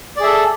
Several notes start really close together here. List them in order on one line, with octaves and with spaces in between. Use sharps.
D5 G#4 E5 A4